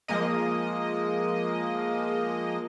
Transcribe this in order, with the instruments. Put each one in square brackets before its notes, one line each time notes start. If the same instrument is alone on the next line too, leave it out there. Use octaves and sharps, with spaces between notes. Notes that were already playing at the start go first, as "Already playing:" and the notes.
[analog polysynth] F3 G#3 A#3 D#5